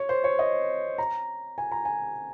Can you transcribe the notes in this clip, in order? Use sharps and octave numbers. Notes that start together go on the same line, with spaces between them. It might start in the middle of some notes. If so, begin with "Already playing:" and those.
Already playing: C#5
C5
C#5
D#5
A#5
G#5
A#5
G#5